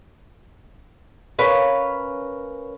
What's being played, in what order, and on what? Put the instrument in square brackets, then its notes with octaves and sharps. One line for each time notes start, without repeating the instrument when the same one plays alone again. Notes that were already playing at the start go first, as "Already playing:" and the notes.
[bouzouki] C#4 A#4 B4 F5